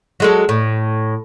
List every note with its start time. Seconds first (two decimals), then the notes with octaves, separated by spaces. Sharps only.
0.20 F#3 G#3 A4
0.49 A2